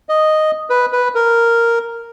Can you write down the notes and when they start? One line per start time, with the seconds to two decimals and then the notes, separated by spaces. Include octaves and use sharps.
0.09 D#5
0.70 B4
0.92 B4
1.15 A#4